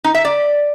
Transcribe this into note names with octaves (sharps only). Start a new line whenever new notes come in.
D#4
E5
D5